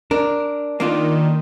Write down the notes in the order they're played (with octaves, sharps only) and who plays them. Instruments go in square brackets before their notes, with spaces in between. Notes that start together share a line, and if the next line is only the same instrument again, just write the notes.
[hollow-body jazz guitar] D4 [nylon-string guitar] A#4
[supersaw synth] D#3 [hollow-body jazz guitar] A#3 D4 F4